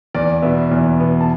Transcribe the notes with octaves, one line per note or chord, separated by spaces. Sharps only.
E2 D5
B2 B3 E5
E2
B2 B3
A5